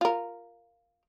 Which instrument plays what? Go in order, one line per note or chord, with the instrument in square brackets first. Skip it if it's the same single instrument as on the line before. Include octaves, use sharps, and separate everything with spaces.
[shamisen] F4 A#4